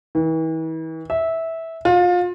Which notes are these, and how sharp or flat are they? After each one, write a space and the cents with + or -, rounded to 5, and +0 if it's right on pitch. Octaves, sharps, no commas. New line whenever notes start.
E3 -40
E5 -15
F4 +30